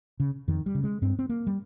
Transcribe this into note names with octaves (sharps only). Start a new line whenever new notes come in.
C#3
F2 D#3
G3
C#3
G#3
G2 C4
C4
A#3
G3